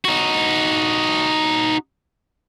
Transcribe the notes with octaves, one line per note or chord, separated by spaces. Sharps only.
D#4 F#4